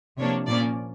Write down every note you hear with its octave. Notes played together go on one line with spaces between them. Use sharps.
C3 F3 A#3 D4 C#5
A#2 F3 A#3 C#4 D5